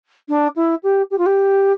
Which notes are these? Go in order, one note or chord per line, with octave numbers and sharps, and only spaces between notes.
D4
E4
G4
G4
F4
G4